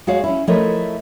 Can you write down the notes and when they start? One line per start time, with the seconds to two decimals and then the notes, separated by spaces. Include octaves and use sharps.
0.07 G#3 F#4 G#4 C#5 F5
0.24 C#4 E4
0.47 F3 A3 E4 A#4 C#5 D#5